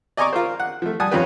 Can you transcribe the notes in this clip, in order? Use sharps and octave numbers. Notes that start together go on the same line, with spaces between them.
D5 D#5 G#5 A#5 C#6 D6
F4 A#4 C5
F#5
F3 A3
G3 F#5 G#5 A5 D#6
F2 C#4 F4 G4 B4